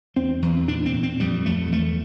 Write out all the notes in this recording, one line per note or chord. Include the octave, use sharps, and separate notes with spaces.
E2 C4
E2
A#2 D4
C4
A#2
C4
F2 G3
F2 A3
E2 A3